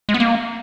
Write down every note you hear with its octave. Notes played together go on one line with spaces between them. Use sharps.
G#3
B3
A#3